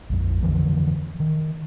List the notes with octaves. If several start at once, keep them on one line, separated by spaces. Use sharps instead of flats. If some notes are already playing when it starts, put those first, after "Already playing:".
A#1 F2
F2 D3 E3 F3
D#3